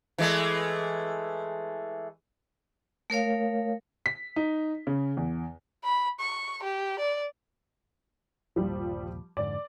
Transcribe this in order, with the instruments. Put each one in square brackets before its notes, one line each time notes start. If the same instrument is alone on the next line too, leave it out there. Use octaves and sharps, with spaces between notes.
[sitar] E3 G#3 A3
[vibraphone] A3 A#4 C#5 F5
[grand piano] B6
D#4
C#3
E2
[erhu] B5
C#6
G4
D5
[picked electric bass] G1 D#2 A#2 [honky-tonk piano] F3 G3
[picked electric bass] F2 G#2 D3 [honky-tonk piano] D5